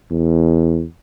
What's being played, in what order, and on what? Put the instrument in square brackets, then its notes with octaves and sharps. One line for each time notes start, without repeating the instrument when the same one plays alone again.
[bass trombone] E2